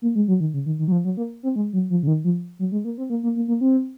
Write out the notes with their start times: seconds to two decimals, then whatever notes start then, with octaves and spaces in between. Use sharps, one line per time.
0.02 A#3
0.15 G#3
0.28 F#3
0.40 D#3
0.54 C#3
0.66 D#3
0.79 D#3
0.88 F#3
0.92 F3
1.05 F#3
1.17 A#3
1.43 C4
1.56 G#3
1.73 F#3
1.90 F3
2.03 C#3
2.07 D#3
2.24 F3
2.59 F#3
2.72 G#3
2.84 A#3
2.98 C4
3.10 A#3
3.23 A#3
3.36 A#3
3.48 A#3
3.61 C4